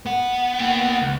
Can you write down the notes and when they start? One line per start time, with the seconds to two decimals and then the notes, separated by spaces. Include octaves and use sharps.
0.06 B3 F#5
0.60 A#3 G5
1.02 C#2